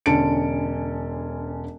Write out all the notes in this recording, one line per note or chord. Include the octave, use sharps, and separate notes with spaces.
E1 D3 C#4 A5 C#7 D7